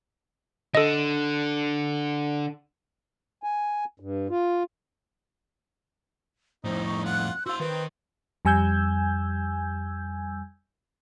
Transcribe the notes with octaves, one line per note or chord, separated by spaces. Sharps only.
D3 A4 D#5
G#5
G2
F4
F2 A2 D#4 C5
C#6
F4 F#5 F#6
F#4 C5 F5 E6
D#3 C4 B4
F2 G3 G#5 E6 G6 G#6